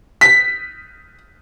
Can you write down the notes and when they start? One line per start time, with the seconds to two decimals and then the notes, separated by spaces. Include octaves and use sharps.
0.21 B6